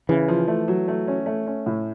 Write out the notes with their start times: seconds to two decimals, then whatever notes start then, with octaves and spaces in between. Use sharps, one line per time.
0.09 C#3 E3
0.28 F3
0.48 A3
0.68 F#3
0.88 A3
1.08 C#4
1.26 A3
1.47 C#4
1.66 A2